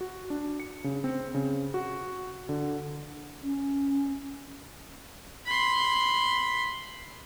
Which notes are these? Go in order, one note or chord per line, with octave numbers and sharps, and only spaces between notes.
F#4
D4
C#7
C#3
C4
C#3
F#4
D3
C#4
B5 C6